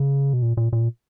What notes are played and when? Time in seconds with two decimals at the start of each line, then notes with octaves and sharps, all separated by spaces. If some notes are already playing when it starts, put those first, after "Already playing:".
Already playing: C#3
0.33 B2
0.42 A#2
0.57 A#2
0.73 A#2